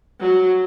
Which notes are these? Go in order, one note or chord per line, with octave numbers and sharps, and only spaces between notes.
F#3